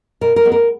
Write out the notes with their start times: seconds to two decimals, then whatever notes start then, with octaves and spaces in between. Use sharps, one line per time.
0.21 B2 A#4
0.36 A#4
0.45 G#3 B3
0.52 A#4